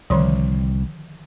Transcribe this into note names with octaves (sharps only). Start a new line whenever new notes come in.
C2 D3 D#3 F3